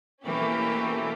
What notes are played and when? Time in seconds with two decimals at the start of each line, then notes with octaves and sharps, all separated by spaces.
0.23 B2 E3 A3 A#3 C#4 G4